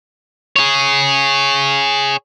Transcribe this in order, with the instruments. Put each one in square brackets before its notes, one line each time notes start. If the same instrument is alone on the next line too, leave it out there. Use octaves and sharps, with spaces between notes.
[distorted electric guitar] G#4 C#5